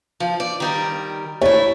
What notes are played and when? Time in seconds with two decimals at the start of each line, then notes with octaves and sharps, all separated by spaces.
0.20 F3
0.40 D5
0.60 D#3 G3 A#4
1.41 A3 E4 C#5